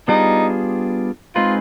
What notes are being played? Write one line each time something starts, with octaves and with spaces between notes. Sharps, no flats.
G3 B3 D4 D#4 F4 G#4
G#3 C4 D#4 F4 G#4 B4